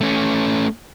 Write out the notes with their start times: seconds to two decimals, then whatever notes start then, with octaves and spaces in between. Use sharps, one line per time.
0.01 A3 C#4